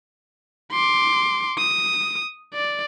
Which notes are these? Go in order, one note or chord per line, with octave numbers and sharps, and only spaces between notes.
C6 D6
D#6
D5